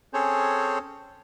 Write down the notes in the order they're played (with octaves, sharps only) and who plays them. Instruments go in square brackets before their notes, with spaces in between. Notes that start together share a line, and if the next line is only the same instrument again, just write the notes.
[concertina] C4 C#4 G#4 A4 C5 C#5